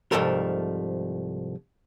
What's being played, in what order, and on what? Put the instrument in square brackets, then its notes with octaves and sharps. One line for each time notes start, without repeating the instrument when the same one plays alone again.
[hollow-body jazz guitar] C2 G#2 F3 A3 A4 A#4